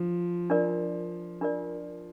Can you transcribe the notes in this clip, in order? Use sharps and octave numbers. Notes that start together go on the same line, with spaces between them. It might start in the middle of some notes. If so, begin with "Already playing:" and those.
Already playing: F3 D4
D4 F4 A#4 D5
D4 F4 A#4 D5